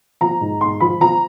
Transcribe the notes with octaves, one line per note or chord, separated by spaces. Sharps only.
F3 A#5
G#2
G#2 C6
F3 B5
F3 A#5